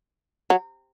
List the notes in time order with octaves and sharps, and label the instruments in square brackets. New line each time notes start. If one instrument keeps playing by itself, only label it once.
[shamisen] F#3